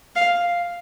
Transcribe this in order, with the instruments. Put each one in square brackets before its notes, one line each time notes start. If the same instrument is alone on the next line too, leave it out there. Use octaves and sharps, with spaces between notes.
[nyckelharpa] F5